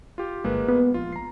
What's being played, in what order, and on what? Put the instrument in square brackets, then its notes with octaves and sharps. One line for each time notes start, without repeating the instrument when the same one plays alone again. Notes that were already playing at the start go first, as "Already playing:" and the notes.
[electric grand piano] F4 G4
[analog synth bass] G1 [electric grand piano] G#3 A#3 B4
[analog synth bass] B3
[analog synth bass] A#1 [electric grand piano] F4
[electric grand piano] A#5 C7